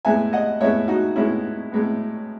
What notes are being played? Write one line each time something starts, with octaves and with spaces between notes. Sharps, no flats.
A2 G#3 B3 E5 G#5
D#5 F#5
A2 G#3 B3 C#5 E5
D#4 F#4
A2 G#3 B3 C#4 E4
A2 G#3 B3